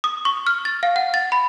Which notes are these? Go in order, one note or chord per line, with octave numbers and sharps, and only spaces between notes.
D#6
C#6
F6
A6
F5
F#5
A6
B5